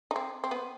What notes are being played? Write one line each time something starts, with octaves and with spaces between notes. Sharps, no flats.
D#4
C4
C4
B3